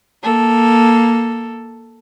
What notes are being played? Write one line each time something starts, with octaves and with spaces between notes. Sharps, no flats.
A#3 A4